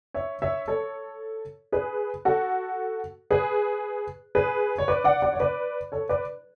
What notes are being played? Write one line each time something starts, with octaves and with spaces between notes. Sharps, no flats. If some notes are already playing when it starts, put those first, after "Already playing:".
C#5 E5
C#5 E5
A4 C#5
G#4 B4
F#4 A4
G#4 B4
G#4 B4
C#5
B4 D5
D5 F#5
D5 F#5
C#5
B4 D5
A4 C#5
B4 D5